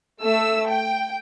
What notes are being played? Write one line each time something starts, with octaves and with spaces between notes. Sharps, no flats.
A3 E6
G5